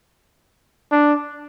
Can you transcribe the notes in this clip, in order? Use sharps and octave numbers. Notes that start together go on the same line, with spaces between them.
D4